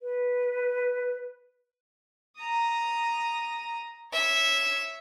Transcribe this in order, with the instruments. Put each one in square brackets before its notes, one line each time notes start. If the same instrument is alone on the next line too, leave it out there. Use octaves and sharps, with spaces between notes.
[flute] B4
[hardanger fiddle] A#5 D#6
[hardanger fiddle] C#5 [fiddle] E5